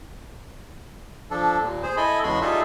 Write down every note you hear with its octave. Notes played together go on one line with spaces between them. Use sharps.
F3 D4 A4
D#2 A#2
G#4 C5
E4 A4 D#5 G#5 B5
E2 C#3 G#3 F#4 B5 C6
G3 D#4 F4 G#4 A4 E5